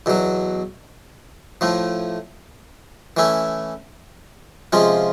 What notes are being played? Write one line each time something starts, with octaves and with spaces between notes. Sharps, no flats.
E2 B2 F#3
A2 F3 A3
E3 A3 C#4 E4
C3 F3 G#3 C#4 F4